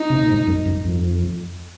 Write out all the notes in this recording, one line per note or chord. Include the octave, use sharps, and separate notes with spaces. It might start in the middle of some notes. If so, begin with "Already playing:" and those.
Already playing: D#4
C3
A#2
G#2
F#2
F#2
F2